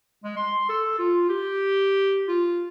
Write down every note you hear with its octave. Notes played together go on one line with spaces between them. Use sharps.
G#3
C6
A4
F4
G4
F4